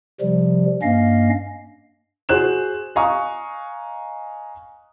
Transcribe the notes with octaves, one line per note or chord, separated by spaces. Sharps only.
C3 F3 G3
G2 A#3 C#4 D#5 F5
F#4 G#4 C5 F#6 E7
D#5 F5 G#5 A#5 C#6 D#6